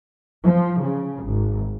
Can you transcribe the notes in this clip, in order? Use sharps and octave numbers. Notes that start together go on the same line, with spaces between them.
F3
C#3
G#1